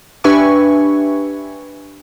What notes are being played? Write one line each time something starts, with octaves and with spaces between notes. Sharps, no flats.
D4 G4 B4 E5 G#5 C#6